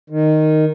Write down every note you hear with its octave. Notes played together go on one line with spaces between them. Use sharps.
D#3